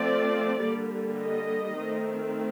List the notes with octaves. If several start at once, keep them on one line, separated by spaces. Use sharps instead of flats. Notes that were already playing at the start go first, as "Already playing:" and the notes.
Already playing: F3 A3 C4 D5
D3 G3 A#3
D#5
D#3 A3 C4